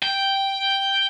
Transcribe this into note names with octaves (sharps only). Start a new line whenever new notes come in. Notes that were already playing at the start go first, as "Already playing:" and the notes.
G5